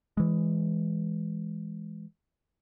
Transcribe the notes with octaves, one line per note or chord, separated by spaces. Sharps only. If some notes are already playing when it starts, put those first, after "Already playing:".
E3 G#3